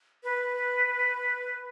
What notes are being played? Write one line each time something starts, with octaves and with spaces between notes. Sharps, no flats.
B4